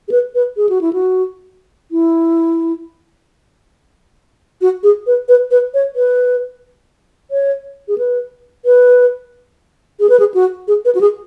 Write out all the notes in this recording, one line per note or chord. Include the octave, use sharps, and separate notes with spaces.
G#4
B4
B4
G#4
F#4
E4
F#4
E4
F#4
G#4
B4
B4
B4
C#5
B4
C#5
G#4
B4
B4
G#4
B4
G#4
F#4
G#4
B4
F#4
G#4